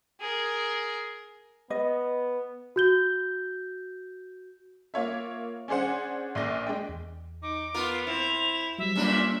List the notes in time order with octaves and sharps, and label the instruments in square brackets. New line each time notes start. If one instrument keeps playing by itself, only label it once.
[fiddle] G#4 A#4
[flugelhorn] B3 [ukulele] D#5
[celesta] F#4 G6 G7
[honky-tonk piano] A#3 F4 C#5 E5
C#4 D4 G#4 C5 F#5
A#1 A#2 A#6
G#3 D4 G5
[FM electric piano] E2
[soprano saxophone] D#4 [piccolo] D6
[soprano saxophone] B3 [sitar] F4 A#4
[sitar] C4 [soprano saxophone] E4 [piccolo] F7
[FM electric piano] F#3 G3 [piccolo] E5
[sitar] F#2 A#2 D4 [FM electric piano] G3 A#3 F4 [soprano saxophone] C#4